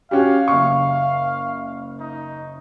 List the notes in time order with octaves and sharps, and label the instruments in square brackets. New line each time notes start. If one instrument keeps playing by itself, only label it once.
[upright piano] C#4 F#4 G4 [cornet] F5
[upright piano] F#1 C#6
[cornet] D#4